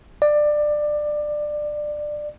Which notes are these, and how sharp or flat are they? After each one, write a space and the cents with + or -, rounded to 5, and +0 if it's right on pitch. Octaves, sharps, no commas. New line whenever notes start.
D5 +20